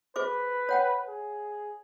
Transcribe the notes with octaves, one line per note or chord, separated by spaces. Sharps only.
G#4 B4 C5 D6
C#5 F#5 G5
G#4